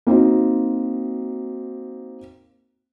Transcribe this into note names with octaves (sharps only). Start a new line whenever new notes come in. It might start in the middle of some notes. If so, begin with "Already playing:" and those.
A#3 C4 D#4 F#4